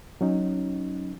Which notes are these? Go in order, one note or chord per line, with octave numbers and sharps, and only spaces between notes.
F#3 C#4 D#4